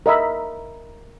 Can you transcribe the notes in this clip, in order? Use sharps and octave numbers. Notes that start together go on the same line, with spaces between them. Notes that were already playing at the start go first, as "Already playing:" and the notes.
A#4 D#5 E5 B5